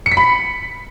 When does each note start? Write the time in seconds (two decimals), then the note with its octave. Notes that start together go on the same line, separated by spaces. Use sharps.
0.06 C#7
0.12 B6
0.17 B5